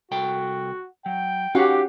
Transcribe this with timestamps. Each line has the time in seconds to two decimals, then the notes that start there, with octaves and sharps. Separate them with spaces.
0.11 C2 F#4 A4 G5
1.06 F#3 G5
1.55 C#4 D#4 F#4 G4 F5 F#5